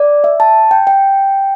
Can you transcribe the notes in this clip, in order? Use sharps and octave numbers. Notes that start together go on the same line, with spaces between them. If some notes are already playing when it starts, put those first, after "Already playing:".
Already playing: D5
E5
A5
G5
G5